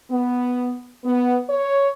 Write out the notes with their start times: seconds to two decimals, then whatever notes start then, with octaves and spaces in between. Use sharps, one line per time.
0.11 B3
1.04 B3
1.49 C#5